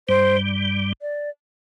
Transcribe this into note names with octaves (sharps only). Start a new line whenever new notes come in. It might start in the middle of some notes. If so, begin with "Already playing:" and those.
G2 G3 C5
D5